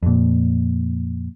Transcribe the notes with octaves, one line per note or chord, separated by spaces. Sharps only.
F2 A#2